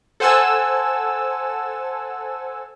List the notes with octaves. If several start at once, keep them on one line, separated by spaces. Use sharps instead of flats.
A4 C5 F#5 G#5 A5 E6